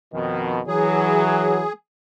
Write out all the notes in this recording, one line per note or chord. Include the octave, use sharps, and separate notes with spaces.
F2 B2 D#3
E3 F#3 G#4